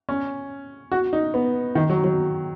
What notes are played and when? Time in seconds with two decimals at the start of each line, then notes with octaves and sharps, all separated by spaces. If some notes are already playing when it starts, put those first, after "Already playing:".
0.09 C#4
0.92 F#4
1.13 D#4
1.34 B3
1.75 D#3
1.90 F#3
2.04 F#3